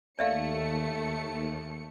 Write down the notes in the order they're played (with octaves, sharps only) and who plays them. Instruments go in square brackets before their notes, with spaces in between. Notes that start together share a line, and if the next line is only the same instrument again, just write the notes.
[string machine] D#2 [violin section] A3 C#7 [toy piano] D5 E5 F5